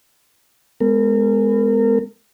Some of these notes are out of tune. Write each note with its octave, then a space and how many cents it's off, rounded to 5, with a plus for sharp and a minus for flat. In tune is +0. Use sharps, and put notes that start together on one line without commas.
G#3 +0 B3 +20 A#4 -30